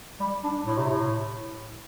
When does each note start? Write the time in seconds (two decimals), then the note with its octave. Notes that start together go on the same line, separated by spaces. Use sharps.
0.20 G3
0.44 D4
0.66 A2
0.78 C3
0.89 A2